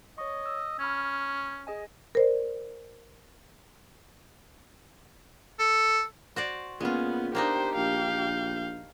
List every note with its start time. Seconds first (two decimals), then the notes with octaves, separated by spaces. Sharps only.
0.18 C#5 D#5 C#6
0.46 E6
0.79 C#4 B5 F6 G#6
1.67 G#4 D#5 G#5
2.15 A#4 C5 D5
5.59 A4
6.36 F#4 C5 D5
6.80 A#2 G#3 B3 C#4 F4
7.35 A#3 D4 D#4 G4 C5
7.76 A#1 F5 G6